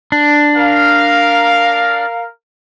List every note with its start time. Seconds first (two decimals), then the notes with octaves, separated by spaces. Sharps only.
0.12 D4
0.57 A#4 F5